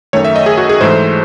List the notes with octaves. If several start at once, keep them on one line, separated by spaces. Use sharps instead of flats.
F#2 D#3 A3 C#5
E5
D#5
G#4
F#4
G#4
G#2 E3 A3 C5